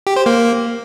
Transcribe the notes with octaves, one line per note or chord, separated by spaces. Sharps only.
G4
C5
A#3